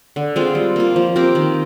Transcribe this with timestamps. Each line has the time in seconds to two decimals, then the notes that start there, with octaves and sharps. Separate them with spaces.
0.16 D3
0.36 G#3 C4 F4
0.55 G3
0.76 A#3 F4
0.96 F3
1.16 C4 G4 A#4
1.35 D#3